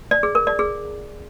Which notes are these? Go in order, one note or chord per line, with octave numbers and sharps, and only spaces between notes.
D5
G#4
A#4
D5
G#4